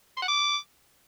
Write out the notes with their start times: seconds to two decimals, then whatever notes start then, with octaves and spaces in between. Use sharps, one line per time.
0.17 C6
0.22 F#5
0.28 D6